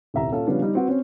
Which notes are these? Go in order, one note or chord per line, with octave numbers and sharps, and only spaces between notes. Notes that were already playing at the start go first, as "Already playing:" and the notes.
D#1 C2 E5 A#5
A#2 C#4 A4 F5
C#3 F3 G3 B3 C#4 D4
G3 D#4
C4 F#4 B4
C4 C#4